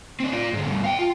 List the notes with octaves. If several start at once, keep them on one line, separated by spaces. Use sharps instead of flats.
C4 D4
F4 D5
G#2 D3
G2 B2
F5 G5
F4